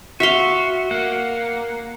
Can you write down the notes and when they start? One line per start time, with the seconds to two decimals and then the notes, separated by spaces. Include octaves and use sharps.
0.20 F#4 E5 F5 C6
0.91 A#3 F#5